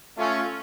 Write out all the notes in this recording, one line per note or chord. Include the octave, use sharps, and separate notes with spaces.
A3 C#4 F4